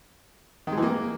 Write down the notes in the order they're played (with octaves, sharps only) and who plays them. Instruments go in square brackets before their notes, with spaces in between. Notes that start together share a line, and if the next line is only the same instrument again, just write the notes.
[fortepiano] D#3
G#3
E3
A#3